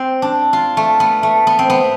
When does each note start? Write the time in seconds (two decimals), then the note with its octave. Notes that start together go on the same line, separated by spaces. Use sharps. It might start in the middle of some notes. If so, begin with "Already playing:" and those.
Already playing: C4
0.22 D4
0.53 F4
0.77 A3
1.00 B3
1.23 A3
1.47 B3
1.59 C4
1.70 B3